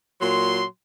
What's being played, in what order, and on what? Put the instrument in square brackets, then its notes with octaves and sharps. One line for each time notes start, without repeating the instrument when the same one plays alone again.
[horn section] A#2 F#3 C6